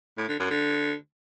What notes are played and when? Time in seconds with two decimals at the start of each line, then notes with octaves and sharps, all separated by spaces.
0.18 A2
0.29 D3
0.40 F#2
0.51 D3